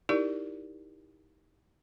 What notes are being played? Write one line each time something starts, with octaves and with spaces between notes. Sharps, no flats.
D#4 E4 G4 A#4 D5